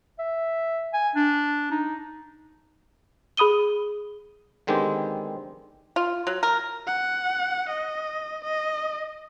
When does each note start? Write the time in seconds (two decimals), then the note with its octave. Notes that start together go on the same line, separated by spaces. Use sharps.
0.19 E5
0.93 G#5
1.15 D4
1.71 D#4
3.37 G#4 B5 D#6 D#7 G7
4.67 D3 D#3 G#3 B3 C4 G4
5.96 F4
6.27 F#3
6.43 A#4
6.87 F#5
7.69 D#5
8.44 D#5